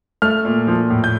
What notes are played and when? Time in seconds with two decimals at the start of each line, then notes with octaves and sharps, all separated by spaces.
0.22 A3 F6
0.45 A#2
0.67 F3
0.90 A2
1.04 G6